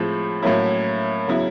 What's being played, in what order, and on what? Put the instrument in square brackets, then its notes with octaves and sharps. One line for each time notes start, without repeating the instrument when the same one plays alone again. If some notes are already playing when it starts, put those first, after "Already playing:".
Already playing: [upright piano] A2 F3 G#3 C4
A2 F#3 A#3 C#4 E4
C#3 F#3 B3 E4